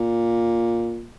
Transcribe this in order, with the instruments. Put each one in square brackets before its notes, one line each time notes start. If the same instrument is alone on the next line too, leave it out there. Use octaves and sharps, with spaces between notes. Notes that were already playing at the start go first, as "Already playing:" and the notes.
Already playing: [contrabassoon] A#2